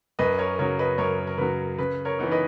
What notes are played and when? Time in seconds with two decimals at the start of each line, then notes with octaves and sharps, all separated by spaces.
0.19 F#2 B4 D#5
0.39 A#4 C#5
0.59 C#3 F#3 A#4 C#5
0.79 B4 D#5
0.98 F#2 A#4 C#5
1.27 A#4
1.38 C#3 F#3 B4
1.78 C#3 B4
2.05 A#4 C#5
2.19 E3 B3 D#4
2.31 B4 D#5